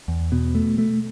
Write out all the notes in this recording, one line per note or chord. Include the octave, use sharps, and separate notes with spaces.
E2
B2
A3
A3